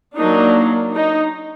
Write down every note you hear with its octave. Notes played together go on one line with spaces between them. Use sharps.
F#3 A#3 D4 D#4
D#4